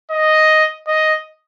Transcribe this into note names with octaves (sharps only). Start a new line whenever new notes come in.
D#5
D#5